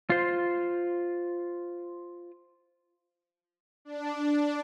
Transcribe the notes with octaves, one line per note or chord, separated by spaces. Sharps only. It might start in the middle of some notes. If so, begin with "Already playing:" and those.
F4 C5
D4